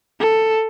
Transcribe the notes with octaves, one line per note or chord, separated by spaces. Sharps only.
A4